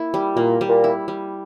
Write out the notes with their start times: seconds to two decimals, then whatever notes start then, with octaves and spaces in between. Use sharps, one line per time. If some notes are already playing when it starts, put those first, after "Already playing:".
Already playing: A#3 E4
0.14 G3
0.36 A#2 A#3
0.61 G3
0.69 A#2
0.84 E4
1.08 G3